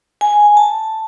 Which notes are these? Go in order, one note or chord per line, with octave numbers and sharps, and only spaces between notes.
G#5
A5